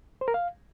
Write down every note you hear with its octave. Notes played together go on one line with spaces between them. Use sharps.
C5
A#4
F5